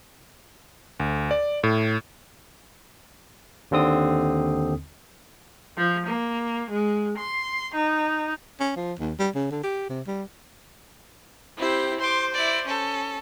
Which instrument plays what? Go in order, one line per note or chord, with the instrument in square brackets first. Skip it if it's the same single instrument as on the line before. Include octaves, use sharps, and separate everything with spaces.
[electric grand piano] D2
D5
A2
[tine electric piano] D#2 D3 C4 D#6
[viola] F3
A#3
G#3
C6
D#4
[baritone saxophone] C#4
F3
D#2
G3
C#3
D3
G4
C3
G3
[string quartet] C4 C5 [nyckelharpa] E4 G4
[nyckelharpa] C5 [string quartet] C6 D6
[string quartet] E4 D5
C#4 A4